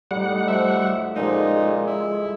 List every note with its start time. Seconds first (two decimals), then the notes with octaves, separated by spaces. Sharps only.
0.11 A2 G3 D#4 F#5
0.48 F3 F#3 E5
1.16 A#2 C#3 F3 G#3 D#4
1.88 E4